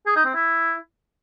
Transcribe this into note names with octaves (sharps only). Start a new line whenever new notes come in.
G#4
D#4
C4
E4